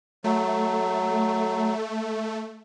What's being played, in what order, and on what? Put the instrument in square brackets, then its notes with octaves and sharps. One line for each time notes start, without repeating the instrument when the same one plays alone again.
[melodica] F#3 [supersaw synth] A3